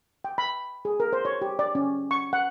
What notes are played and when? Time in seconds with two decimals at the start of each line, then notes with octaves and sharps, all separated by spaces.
0.24 G5
0.38 B5
0.85 G#4
1.00 A#4
1.13 C5
1.25 C#5
1.42 G4
1.59 D5
1.75 C#4
2.11 C#6
2.33 F#5